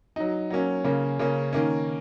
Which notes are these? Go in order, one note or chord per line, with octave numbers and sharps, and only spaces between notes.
F#3 D#4
F#3 A#3 C#4
C#3 A#3 C#4
C#3 A#3 C#4
D#3 A#3 C#4